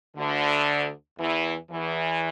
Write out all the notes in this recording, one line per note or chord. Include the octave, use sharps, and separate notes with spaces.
D2 D3
E2 E3
E2 E3